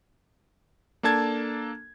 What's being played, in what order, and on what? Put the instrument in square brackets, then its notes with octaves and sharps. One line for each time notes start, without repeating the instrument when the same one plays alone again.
[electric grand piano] A#3 D4 A4 A5 G#6